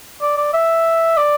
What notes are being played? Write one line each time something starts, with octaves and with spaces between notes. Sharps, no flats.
D5
D5
E5
D5